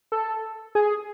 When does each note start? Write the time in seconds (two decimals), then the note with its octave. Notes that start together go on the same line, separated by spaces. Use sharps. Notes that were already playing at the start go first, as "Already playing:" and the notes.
0.12 A4
0.75 G#4